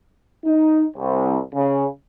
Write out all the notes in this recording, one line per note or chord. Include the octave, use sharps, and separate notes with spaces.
D#4
C2
C#3